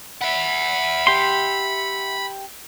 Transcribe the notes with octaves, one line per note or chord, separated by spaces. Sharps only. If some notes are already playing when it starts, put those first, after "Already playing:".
E5 F#5 B5
G4 C6